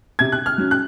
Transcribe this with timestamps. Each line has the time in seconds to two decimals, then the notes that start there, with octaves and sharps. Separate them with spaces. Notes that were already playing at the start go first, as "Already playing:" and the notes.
0.19 C3 G#6
0.32 F#6
0.46 F6
0.58 F#3 C#4
0.71 F#6